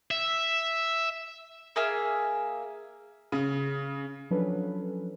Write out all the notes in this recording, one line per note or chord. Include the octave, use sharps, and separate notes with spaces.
E5
A#3 G#4 E5 F6
C#3
F3 F#3 C#4 D4 A4 B4